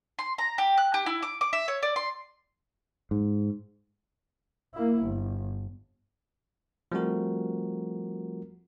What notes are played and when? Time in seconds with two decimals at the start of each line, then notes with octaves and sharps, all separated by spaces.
0.19 C6
0.38 A#5
0.58 G4
0.78 F#6
0.94 G4
1.06 E4
1.22 D6
1.41 D6
1.53 E5
1.68 C#5
1.83 D5
1.96 C6
3.11 G#2
4.74 A#3 E4
5.03 G1
6.92 F3 G3 A3 C4 F#4 A#4